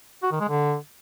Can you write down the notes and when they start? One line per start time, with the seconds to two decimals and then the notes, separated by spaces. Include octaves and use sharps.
0.23 F#4
0.32 D#3
0.40 G#3
0.49 D3